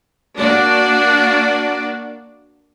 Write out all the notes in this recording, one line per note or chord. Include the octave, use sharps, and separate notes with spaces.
A#3 D4 F#4 D5